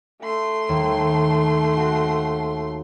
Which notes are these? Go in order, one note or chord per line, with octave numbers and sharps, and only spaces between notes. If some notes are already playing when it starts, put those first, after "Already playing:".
A3 C6
D#2
F#4